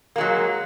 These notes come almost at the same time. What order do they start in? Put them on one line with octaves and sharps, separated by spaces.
A#3 G#3 F#3